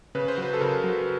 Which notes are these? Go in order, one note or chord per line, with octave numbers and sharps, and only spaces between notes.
C#3 B4
C5
F#3 B4
A4
C#3 A#4
F#3